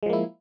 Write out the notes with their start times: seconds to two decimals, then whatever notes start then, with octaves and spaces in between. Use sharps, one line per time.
0.03 G#3
0.06 F3
0.10 A#3
0.13 E4